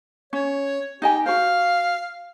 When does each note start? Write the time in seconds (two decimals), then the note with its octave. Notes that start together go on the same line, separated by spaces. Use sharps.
0.33 C#4 C#5
1.02 D#4 G4 D#5 G#5
1.26 F#4 C5 F5